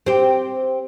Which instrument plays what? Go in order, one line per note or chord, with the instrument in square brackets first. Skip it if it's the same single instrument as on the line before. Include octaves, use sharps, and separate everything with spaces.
[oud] C4 G4